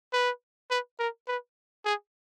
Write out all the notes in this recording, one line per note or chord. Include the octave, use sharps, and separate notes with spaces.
B4
B4
A#4
B4
G#4